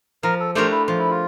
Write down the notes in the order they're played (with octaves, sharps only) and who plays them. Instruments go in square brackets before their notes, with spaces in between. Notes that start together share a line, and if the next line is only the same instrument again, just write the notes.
[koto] F3 [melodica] A#4
[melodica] A4
[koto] A3 D4 G4 A#4 [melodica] C5
[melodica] E4
[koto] F3 [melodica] F4
[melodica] E4
F4